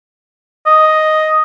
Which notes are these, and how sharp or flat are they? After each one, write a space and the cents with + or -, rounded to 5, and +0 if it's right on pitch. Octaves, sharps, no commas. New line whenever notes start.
D#5 +5